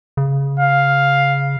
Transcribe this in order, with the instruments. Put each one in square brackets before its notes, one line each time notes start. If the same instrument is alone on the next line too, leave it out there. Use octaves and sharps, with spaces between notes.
[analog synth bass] C#3
[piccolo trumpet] F5